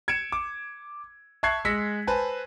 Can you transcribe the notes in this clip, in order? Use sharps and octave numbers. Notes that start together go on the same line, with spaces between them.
G#6 C#7 D7 E7
D6
E5 A5 C#6 F#6 G#6 C7
G#3 E6 A#6 B6 C#7
B4 C5 G#5 A5